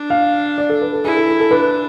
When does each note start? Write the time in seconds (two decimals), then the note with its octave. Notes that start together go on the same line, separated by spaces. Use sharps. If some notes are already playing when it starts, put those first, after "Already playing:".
Already playing: D4
0.10 F5
0.58 D5
0.70 A4
0.82 B4
0.93 A4
1.04 E4 G#4
1.17 A4
1.28 A4
1.40 A4
1.51 D4 B4